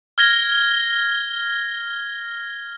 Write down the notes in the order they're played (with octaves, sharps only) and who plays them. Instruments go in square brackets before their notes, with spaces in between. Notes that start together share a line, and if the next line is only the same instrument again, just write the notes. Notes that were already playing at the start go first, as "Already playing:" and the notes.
[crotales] F6 G#6 A#6 G7